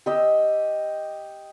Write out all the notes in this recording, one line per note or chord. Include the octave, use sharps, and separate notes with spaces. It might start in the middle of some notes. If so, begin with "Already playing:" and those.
G4 D#5 E6